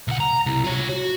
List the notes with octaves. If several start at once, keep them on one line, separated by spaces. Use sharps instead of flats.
C2 F#5
A#5
C2
F4 C#5
F#4